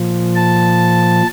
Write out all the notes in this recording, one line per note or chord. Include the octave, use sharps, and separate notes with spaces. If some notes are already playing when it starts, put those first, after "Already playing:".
Already playing: A#2 F3
A5